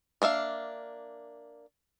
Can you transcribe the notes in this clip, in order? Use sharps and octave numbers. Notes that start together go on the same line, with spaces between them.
A#3 D4 E5 F5